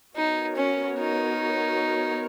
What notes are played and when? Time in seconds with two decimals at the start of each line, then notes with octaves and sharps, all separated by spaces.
0.15 B3 D#4 F#4 A#4 C#5
0.57 C#4
0.99 D#4